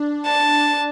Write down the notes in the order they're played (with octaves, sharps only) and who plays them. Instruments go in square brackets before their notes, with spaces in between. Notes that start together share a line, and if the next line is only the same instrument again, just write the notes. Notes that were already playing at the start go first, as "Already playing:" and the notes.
Already playing: [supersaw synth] D4
[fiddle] A5